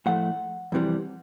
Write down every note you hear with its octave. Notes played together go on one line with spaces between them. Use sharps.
A2 F3 A3 F#5
F2 C3 E3 G3